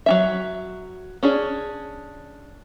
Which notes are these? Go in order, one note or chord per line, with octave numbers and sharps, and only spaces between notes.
F#3 C#4 E5
C#4 D4 G#4